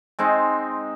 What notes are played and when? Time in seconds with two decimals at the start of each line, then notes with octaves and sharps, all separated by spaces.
0.19 G#3 C4 D#4